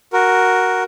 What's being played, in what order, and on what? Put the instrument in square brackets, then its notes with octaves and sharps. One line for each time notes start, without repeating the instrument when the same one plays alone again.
[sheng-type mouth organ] F#4 A#4